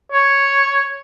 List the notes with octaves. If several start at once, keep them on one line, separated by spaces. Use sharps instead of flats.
C#5